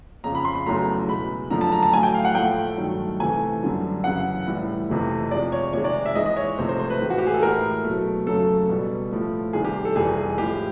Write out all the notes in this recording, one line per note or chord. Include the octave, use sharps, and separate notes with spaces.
F2 C#3 F3 A#5
B5
C6
B5
E2 C#3 F#3 A3 A#5
B2 G#3 B5
F#2 D3 F3 A3 A#5
A5
A#5
A5
A2 F#3 A3 G#5
G5
F5
F#5
A2 F3 A3 G5
G2 D#3 F#3 A3
C3 E3 A3 G#5
F#2 D3 G3
F#2 C#3 E3 F#5
A2 E3 G3
F2 C3 E3 A3
C3 F3 G#3 D5
C#5
C3 D#3 G#3 C#5
D5
E5
G#2 E3 G#3 D#5
D#5
C#5
C3 F3 A3 C5
C5
C5
B4
A2 E3 G#3
F#4
G4
G#4
A4
A2 E3 G#3 A#4
B2 F#3 A3
F#2 C#3 F#3 A3 A4
B2 G3
A2 F3 A3
E2 C3 D#3 G3 G#4
G4
A4
F2 C3 E3 G3 G#4
G#4
A2 F3 G#3 G4